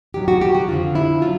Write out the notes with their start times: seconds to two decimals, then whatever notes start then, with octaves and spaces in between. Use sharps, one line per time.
0.14 G2 D#3 F#3 G4
0.28 F#4
0.41 G4
0.55 F#4
0.68 F2 D3 F3 F4
0.95 E4
1.22 F#3 F4